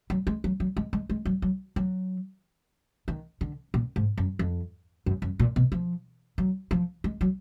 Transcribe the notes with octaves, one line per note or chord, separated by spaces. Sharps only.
F#3
G#3
F#3
F#3
G#3
G#3
G#3
F#3
F#3
F#3
D#3
D3
A#2
G#2
F#2
F2
F#2
F#2
A#2
B2
F3
F#3
F3
G#3
F#3